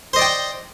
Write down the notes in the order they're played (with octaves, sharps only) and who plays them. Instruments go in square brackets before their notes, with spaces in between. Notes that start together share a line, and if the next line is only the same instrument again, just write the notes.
[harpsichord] C5
D#5
D5
G5